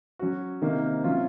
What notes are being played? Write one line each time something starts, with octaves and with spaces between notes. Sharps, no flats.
F#3 C#4 F#4
C3 D#3 A#3
C3 F#3 C#4 F4